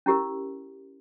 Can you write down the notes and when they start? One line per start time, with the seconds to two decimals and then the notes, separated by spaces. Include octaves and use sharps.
0.06 C#4 E4 G4 A#4